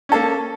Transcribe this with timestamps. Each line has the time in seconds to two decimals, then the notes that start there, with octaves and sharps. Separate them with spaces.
0.09 C#4
0.12 A4
0.14 A#3